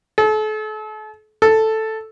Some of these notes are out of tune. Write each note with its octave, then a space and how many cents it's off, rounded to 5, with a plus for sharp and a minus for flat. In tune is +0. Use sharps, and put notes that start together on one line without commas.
A4 -40
A4 +0